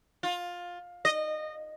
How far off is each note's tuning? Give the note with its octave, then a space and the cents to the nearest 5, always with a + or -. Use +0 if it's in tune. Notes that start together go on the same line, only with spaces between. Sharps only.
F4 +15
D#5 -20